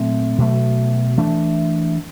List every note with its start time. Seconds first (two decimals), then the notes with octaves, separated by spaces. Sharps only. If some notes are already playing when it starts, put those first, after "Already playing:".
Already playing: A#2 F#3 A3 C4
0.38 B2 F#3 A3
1.17 E3 A3 D4